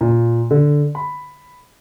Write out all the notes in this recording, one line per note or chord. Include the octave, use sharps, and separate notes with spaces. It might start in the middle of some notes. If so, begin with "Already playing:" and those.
A#2
D3
B5